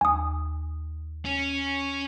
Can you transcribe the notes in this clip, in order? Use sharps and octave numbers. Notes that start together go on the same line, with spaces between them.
D#2 G#5 D#6
C#4